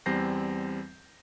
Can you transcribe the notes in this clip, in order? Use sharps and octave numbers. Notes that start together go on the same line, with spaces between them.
E2 G3 C4 G6 A#6 C7